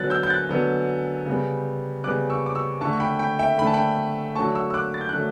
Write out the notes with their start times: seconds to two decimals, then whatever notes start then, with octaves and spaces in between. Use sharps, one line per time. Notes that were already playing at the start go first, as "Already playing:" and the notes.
Already playing: D3 F#3 B3 F#6 A6
0.10 E6 G6
0.23 G6
0.30 F#6 A6
0.49 D3 F#3 B3
1.26 C#3 G3 B3
2.04 C#3 G3 B3 D6 F#6
2.30 C#6 E6
2.46 D6
2.55 C#6 E6
2.81 D3 A5 C#6
2.85 A3
2.93 C#6
3.00 G5 B5
3.19 G5 B5
3.39 E5 G5
3.58 D3 A3 B5
3.67 A5
3.74 G5 B5
4.35 D3 F#3 A3 A5 C#6
4.55 C#6 E6
4.70 E6
4.74 D6 F#6
4.94 A6
5.01 G6
5.09 F#6
5.13 D3 F#3 A3